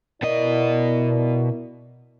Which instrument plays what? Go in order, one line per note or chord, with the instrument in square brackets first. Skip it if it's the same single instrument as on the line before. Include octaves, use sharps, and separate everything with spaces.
[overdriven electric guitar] B2 D#5 [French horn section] E4 A#4 D5